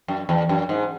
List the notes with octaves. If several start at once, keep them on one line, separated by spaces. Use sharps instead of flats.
F#2
E2
F#2
G#2